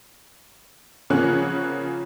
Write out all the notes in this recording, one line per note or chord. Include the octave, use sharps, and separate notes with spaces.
C#3 F3 A#3 C#4 F#5 F#6